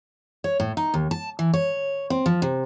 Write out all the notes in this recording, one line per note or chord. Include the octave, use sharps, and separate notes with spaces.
C#5
A2
D#4
D#2
A5
E3
C#5
C4
F3
C3